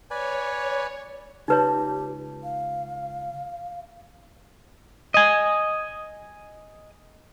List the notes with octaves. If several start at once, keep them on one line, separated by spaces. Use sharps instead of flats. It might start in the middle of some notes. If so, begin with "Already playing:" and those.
B4 C#5 D5 G#5
C#2 D#4 G4 B4 C#5 A5
F5
D#5 G#5